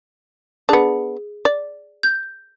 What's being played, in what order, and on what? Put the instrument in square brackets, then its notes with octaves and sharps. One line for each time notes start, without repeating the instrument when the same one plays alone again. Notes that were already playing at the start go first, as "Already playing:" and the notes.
[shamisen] B3 D4 [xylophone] G#4
[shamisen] D5
[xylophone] G6